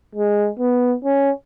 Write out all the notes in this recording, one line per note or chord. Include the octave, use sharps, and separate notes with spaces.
G#3
B3
C#4